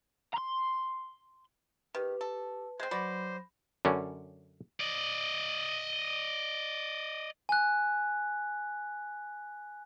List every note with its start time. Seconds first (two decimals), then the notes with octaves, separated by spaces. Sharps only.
0.34 A#5 C6
1.95 D#3 G4 B4
2.21 A4
2.80 G#3 C4 C5
2.91 F#3 F#4 B4 D5 B5 A#6
3.85 F#2 D3 C#4
4.81 D5 D#5
7.49 G#5 F#6